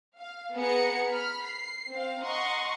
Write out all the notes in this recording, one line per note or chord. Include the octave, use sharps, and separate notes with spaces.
F5
B3 G#4 F#5 A#5 C#7
B5 F6
C7
C4 F5
D#5 F#5 A#5 C6 C#6